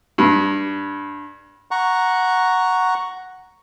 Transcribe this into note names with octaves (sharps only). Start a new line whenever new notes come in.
G2
F#5 A#5 C#6